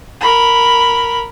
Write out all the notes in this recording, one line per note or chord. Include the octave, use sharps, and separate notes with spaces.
A#4 B5